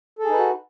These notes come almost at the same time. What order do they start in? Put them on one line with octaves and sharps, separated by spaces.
A4 G#4 D#4 B4 F#4